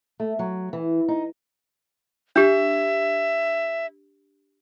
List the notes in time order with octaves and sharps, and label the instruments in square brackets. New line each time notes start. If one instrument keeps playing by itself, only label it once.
[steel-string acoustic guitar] A3
F#3
E3
D#4
[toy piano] D4 G4 [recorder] E5